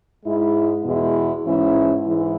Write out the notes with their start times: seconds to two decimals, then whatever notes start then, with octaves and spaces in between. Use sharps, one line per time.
0.24 G#2 G#3 E4
0.85 E2 B2 G#3 E4
1.45 G#2 E3 C#4 E4
2.05 G#2 E3 G#3 E4